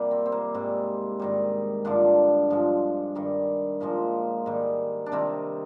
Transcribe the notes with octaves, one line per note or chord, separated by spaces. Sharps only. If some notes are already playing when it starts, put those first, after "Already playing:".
Already playing: C3 G3 A#3
C4
C4
A#3
G#2 G3 C4
G#2 D#3 G3
G2 D3 F3 D4
G2 F3 G#3
G2 D#3 G3
A#2 F3 G#3 A#3
G#2 D#3 G3
D4
C3 D#3 G3 C4